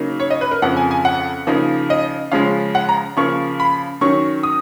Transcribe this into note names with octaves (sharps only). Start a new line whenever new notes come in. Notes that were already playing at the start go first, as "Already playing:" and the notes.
Already playing: C#3 F#3 A#3 D#4
C#5
D#5
B4
A#4
F2 C#3 F3 F#5
G#5
G#5
F#5
C#3 F3 A#3 D#4
D#5
C#3 F3 G#3 C#4 F5
F#5
A#5
C#3 F3 A#3 C#6
B5
D#3 F#3 C#4 C#6
D#6